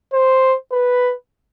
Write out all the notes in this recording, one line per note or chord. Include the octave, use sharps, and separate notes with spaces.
C5
B4